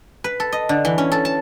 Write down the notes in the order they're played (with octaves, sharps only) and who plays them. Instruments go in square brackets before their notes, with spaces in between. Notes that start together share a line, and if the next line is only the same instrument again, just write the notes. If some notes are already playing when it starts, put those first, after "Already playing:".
[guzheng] B4
A4
D#5
D3
E3
C#4
A4
A5